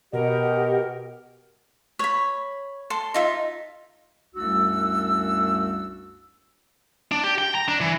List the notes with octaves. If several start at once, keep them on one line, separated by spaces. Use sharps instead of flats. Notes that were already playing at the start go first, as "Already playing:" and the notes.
B2 G4 A#4 D#5 F#5
C#5 B5
A4 C6
D#4 F4 E5
C2 F#2 A3 D4 F#4 E6
D4
G4
G5
A#5
D4
E3